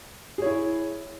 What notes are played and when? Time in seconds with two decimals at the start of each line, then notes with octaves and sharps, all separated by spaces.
0.38 G#4
0.42 C#5
0.46 E4